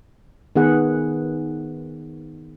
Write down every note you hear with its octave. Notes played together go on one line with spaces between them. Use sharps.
D#3 B3 G#4 F#5